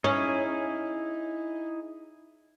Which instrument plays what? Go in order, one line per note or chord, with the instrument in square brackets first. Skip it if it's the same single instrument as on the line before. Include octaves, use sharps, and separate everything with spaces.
[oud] C#4 [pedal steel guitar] D#4 E4 G#4